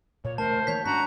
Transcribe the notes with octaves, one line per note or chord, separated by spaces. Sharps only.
A#2 C#5
E1 C#2 A3 A#4 C5 A5
D#3 E3 A#3 C#5 G6 B6
G#2 C#4 D4 F#4 A#5 B6